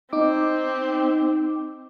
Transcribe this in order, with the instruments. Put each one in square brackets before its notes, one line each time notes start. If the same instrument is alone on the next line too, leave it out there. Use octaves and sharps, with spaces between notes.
[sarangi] C4 [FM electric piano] D#4 D6